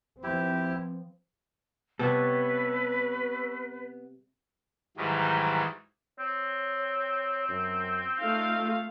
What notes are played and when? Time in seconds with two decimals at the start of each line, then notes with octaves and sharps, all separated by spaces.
0.23 F3 B3 C4 E4 G4
1.99 C3 G3 B3 A4 B4 C#5
4.97 G#2 D#3 E3 F#3 G3
6.19 C4 C#5
7.49 F#2
8.20 A3 D#4 F4 F5